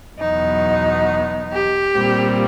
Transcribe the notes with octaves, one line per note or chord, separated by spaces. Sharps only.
E2 B2 F#3 B3 D#4
G4
A#2 G3 C4